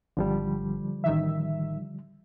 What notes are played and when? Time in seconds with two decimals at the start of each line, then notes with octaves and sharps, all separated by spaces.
0.17 G#1 D3 F3 G3
1.04 A1 D#3 E5